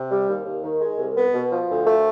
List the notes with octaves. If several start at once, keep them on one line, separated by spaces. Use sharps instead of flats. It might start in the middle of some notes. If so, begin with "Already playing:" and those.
Already playing: C3
G3
D#2
D#2
D#3
G#3
C2
B3
B2
F3
D2
A3